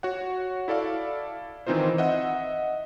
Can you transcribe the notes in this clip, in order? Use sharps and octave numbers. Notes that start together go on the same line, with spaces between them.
F#4 C#5 F#5
E4 A4 D5 F5
D#3 E3 C4 D#4 F4 C5
D#5 E5 F#5